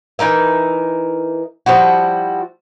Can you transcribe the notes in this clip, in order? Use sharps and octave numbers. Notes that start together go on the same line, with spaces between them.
E3 D#4 A#4 E5
F3 G3 E4 F#4